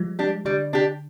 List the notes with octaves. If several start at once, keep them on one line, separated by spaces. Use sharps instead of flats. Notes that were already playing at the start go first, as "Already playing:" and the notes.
Already playing: F3 G3 G#3
D4 G4
D3 G3
D4 G4